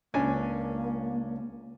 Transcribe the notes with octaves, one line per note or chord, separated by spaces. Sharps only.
C#2 A#3 C#4 D4 G#5